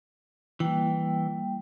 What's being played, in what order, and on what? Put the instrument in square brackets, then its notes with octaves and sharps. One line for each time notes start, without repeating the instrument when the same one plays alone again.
[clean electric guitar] E3 [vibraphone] G3 A#3 G5